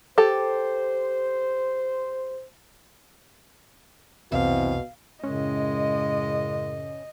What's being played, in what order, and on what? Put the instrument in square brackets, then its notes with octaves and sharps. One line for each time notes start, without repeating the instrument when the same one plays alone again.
[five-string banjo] G4 A4 [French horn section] C5
[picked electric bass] F1 C2 [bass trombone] B2 [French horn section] E3 C4 [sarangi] F5
[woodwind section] F#2 A2 C#3 [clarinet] G#3 [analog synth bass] C#4 [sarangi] D#5